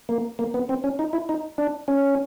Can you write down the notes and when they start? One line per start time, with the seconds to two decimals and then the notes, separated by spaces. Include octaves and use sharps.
0.09 A#3
0.39 A#3
0.54 B3
0.69 C4
0.84 C#4
0.99 D#4
1.13 E4
1.29 D#4
1.58 D4
1.88 C#4